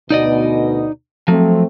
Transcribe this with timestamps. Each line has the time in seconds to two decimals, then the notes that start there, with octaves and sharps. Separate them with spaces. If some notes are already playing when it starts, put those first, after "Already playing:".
0.10 D2 B2 D#4 D5 D#5
1.28 F3 F#3 A3 C4